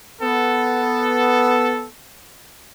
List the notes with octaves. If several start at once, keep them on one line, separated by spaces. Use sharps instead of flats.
B3 A4